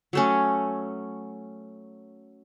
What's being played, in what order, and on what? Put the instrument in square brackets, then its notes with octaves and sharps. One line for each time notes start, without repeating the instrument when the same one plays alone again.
[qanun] F#3 A3 C#4